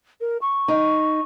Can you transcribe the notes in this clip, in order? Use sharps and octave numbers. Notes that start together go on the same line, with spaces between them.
A#4
C#6
D#4